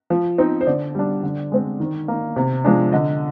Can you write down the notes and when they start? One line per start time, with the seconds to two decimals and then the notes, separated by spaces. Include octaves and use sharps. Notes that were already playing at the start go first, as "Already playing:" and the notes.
0.10 F3
0.38 C4 D#4
0.61 C5
0.67 D3 D5
0.95 G3 D4
1.23 D3
1.52 G#3 C4
1.80 D#3
2.08 A#3 D#4
2.36 C3
2.65 F3 G#3 D4
2.93 D3 D#5